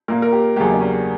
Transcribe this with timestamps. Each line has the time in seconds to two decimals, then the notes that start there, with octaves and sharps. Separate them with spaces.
0.08 A#2 A#3 A#4
0.22 A#4
0.32 G4
0.56 E2 C#3 F#3 A#3 G4
0.71 D4
0.80 C#4